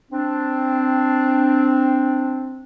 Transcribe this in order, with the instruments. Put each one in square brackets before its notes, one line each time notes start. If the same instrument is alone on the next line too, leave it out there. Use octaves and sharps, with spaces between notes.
[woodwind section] C4 D4